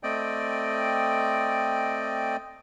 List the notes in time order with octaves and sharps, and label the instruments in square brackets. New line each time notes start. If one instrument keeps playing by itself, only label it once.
[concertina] A3 C4 D5 D#5 G5